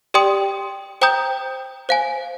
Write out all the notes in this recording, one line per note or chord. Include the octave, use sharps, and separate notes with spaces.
G4 D5 G5 C6 D#6
C5 G5 A#5 D#6 G6
C5 F5 G#5